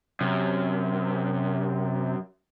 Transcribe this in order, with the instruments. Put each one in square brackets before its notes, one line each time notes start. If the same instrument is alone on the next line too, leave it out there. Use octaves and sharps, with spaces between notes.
[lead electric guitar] F#2 [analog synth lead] C3